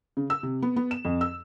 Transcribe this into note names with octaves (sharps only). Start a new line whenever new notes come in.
C#3
E6
C3
B3
B3
E7
F2
E6